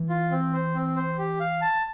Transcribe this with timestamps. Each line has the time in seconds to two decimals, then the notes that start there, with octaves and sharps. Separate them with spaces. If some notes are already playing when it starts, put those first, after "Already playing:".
Already playing: E3
0.09 F4
0.31 C4
0.53 C5
0.74 C4
0.96 C5
1.18 G4
1.40 F5
1.62 A5